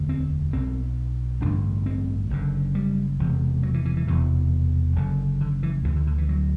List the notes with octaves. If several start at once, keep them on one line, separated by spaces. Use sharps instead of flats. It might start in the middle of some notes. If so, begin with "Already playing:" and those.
Already playing: E1 D2 D3
C4
B1 B2 C4
A1 G2 D3 D4
C4
F#1 F#2 D3
G3
E1 E2 C3
F#3
E3
E3
E3
E1 E2 C3 E3
F#1 F#2 D3
D3
E3
D2 D3 E3
D3
D3
E3
F#3